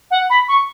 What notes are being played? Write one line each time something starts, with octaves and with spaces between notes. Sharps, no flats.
F#5
B5
C#6